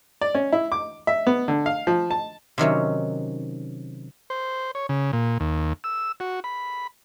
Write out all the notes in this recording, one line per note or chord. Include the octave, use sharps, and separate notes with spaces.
D5
C#4
E4
D6
E5
B3
D3
F5
F3
A5
C3 D#3 F#3 C#4
C5
C#5
C#3
A#2
D#2
E6
F#4
B5